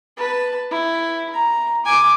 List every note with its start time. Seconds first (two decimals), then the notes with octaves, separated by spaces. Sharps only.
0.17 B4 A5
0.71 E4
1.33 A#5
1.85 G#5 D6